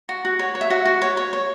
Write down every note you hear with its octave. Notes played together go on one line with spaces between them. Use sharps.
F#4
F#4
C#5
C#5
E5
F#4 F#5
F#4
C#5
C#5
C#5